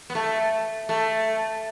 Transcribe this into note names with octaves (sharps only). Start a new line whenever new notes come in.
B3
A3
A3